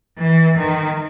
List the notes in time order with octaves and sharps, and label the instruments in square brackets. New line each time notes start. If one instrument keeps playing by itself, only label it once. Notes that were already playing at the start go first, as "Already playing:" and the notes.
[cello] E3
D#3